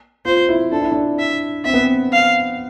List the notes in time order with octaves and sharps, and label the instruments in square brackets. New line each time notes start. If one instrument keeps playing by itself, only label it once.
[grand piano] F4 [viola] C5
[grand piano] E4
[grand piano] D4 [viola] A4
[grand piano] E4
D4
[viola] E5
[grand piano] C4 [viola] E5
[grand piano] B3
C4
[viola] F5